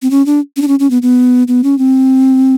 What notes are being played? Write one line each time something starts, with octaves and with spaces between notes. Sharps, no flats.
C4
C#4
D4
C#4
D4
C#4
C#4
B3
B3
B3
C#4
C4